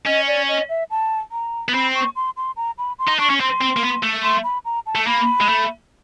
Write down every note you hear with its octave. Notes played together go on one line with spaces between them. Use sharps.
C#4 D#5
D5
D#5
E5
A5
A#5
B3
C4 B5
C#6
C6
C6
A#5
B5
C6
D#4
D4 C#6
C#4
C4 C6
C4
A#3
B3
A3
C6
B5
A#5
A5
A3
A#3 B5
G#3
A3